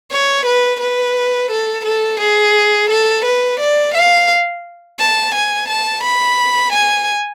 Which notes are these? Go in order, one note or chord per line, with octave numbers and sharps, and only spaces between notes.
C#5
B4
B4
A4
A4
G#4
A4
B4
D5
F5
A5
G#5
A5
B5
G#5